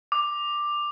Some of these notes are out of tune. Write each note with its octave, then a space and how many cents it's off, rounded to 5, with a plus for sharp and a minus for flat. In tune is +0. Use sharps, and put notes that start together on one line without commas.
D6 +10